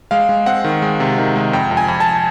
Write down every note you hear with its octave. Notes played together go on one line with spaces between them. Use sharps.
G#3 F5
G#3
C4 F#5
D#3
G#3
C3
D#3
G#3
F2 G5
F2
G#5
F2
A5